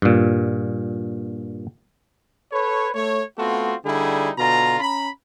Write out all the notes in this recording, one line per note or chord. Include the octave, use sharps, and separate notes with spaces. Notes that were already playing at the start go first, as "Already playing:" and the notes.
G2 A#2
A4 B4 C#5
A3 C#5
A3 B3 C4 F4 F#4
D3 G3 D#4 E4 G#4
B2 D3 F4 A#5
C#4 A#5 B5